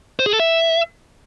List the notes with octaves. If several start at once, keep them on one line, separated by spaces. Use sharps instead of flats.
C5
G#4
A4
E5